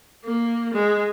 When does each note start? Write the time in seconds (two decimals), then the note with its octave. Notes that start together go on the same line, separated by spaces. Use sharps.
0.25 A#3
0.73 G#3